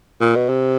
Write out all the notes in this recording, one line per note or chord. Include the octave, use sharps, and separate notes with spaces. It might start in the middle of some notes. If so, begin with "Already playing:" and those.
A#2
B2
C3